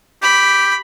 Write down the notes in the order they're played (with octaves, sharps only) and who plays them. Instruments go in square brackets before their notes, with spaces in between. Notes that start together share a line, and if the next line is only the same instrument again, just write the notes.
[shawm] G4 [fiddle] B5